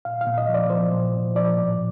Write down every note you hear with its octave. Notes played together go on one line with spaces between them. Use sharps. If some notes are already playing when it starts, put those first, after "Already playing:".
A#2 F5
F5
A#2
D#5
F3
D5
F3 C5
A#2
A#2
F3 D5
A2